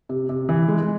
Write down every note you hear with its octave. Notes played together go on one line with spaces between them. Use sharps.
C3
C3
E3
G#3